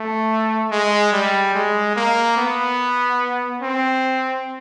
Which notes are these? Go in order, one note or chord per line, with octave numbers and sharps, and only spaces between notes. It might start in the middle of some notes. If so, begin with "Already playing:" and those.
Already playing: A3
G#3
G3
G#3
A#3
B3
C4